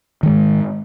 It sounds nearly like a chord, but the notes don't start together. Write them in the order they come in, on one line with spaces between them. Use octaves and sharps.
D#3 G#3 G#2